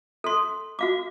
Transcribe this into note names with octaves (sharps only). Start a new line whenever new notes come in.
A4 C6
F#4 F5 D6